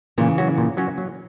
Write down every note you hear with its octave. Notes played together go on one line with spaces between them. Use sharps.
A#2 C#3 E3
F#3 C#4 F#4
A#2
F#3 C#4 F#4
F#3